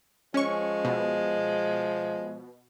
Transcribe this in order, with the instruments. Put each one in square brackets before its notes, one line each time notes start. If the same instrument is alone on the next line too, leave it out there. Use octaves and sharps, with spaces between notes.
[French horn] F3 [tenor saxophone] G#3 [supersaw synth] C#4 C#6
[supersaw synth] B2